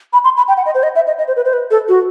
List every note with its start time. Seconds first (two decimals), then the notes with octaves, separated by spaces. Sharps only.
0.13 B5
0.24 C6
0.37 B5
0.48 G5
0.57 F#5
0.66 D#5
0.75 C5
0.83 D#5
0.95 E5
1.07 D#5
1.19 D#5
1.28 C5
1.36 B4
1.45 C5
1.53 B4
1.71 A4
1.89 F#4